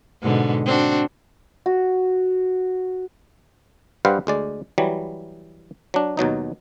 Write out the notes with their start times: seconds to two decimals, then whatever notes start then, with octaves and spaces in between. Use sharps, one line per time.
0.22 G#2 B2 D3
0.65 C4 D4 F#4
1.66 F#4
4.05 G2 G3 B4 C5 F5 F#5
4.27 D2 G#3 D5
4.78 E3 F#3 G3
5.94 F#3 D4
6.17 D#2 B2 F#3 D#4